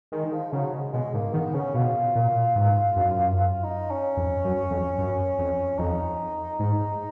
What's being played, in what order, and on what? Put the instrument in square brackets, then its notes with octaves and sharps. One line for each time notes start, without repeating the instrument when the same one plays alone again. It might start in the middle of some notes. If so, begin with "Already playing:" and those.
[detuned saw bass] D#3 [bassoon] G#3
[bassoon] F3
[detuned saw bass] C#3 [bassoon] F#3
[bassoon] G#3
[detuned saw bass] B2 [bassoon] G#3
[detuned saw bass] G#2 [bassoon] A#3
[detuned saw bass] D#3 [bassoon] B3
[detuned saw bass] C#3 [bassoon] C#4
[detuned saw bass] B2 [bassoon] F4
[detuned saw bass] A#2
G#2
F#2
[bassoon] F4
D#4
C#4
[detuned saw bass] F2
F#2
F2
F#2
F2
[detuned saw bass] F2 [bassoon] D#4
[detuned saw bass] G#2